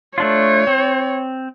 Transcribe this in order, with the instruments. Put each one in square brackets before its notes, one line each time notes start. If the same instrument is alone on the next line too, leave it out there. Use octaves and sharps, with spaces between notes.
[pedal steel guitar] A3 D4 F4 [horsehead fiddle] C#5
[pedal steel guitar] C4